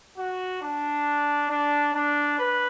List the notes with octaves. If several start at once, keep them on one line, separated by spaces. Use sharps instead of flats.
F#4
D4
D4
D4
B4